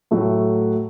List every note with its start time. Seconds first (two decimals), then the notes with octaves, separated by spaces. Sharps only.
0.11 A2 F#3 A3 F#4